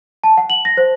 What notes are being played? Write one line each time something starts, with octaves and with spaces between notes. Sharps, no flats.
A5
F#5
F#7
A#6
C5